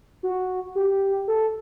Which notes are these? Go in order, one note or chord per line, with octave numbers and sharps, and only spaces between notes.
F#4
G4
A4